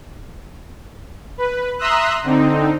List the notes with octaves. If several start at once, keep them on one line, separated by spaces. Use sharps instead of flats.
B4
E5 A#5 C6 D#6 E6 F#6
D3 C4 D#4